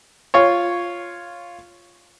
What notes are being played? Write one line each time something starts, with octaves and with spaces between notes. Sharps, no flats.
F4 C#5